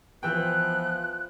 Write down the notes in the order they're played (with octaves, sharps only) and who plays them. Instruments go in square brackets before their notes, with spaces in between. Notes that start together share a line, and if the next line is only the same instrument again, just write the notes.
[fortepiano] E3 G5 [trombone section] F3 B3 [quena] F#6